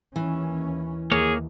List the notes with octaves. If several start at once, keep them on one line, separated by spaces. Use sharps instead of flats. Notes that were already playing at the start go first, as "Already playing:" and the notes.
D#2 E3 C#4
D#2 A#3 G#4 C#5